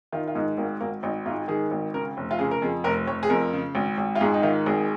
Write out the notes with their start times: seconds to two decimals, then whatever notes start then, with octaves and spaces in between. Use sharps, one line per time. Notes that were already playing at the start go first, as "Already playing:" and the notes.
0.13 D#3 F4
0.28 F4
0.35 G#2 D#4
0.57 G#1 A#3
0.80 G#1 A#3
1.03 G#1 D#4
1.26 G#2 F4
1.48 D#3 G#4
1.71 G#1
1.94 C#3 A#4
2.17 F1
2.31 F4
2.39 C#3 G#4
2.51 A#4
2.62 F2 G#4
2.84 F1 A#4
3.07 F1 C#5
3.23 G#4
3.29 F2 A#4
3.53 C#3
3.75 G#1
3.97 G#1
4.15 F4
4.21 G#2 G#4
4.34 D#4
4.43 D#3 F4
4.66 G#1 G#4